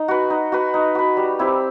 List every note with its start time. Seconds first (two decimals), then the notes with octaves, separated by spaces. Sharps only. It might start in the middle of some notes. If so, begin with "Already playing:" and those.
Already playing: D#4
0.08 F#4 B4
0.30 D#4
0.52 F#4 B4
0.74 D#4
0.95 F#4 B4
1.17 G3
1.39 C4 E4 G4